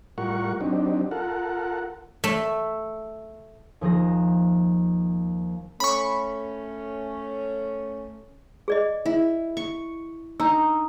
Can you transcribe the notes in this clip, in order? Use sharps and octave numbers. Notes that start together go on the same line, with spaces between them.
A2 G3 F4 A#4 F#5 C#6
F#3 C4 D4 D#4 G4
F4 A4 A#4 F#5
A3
D#2 F3 G#4 A#6
A3 C#4 B5 C#6
G#4 D5 D#5
E4
C#6
D4 D#4 A#5 E6